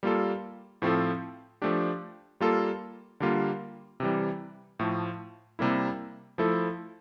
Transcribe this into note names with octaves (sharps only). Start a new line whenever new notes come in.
G3 A#3 F4 A4
A2 F3 C4 F4 A4
F3 A3 D4 G4
G3 A#3 F4 A4
D3 G3 A#3 F4
C3 E3 G3
A2 F3 A3
C3 G3 A#3 E4
F3 A3 E4 A4